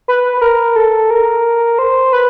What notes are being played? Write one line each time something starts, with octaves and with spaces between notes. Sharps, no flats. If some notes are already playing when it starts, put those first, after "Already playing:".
B4
B4
A#4
A4
A#4
C5
B4